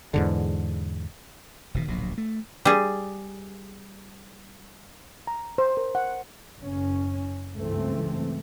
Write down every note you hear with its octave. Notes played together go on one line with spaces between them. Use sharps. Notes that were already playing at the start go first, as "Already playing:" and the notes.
E2 G#2 D3
E1 B2 D#3
D1 A#1 B2 F#3
A3
G3 G#4
A#5
C5
A#4
F#5
F#1 C#4
C#2 G2 E3 A3 C4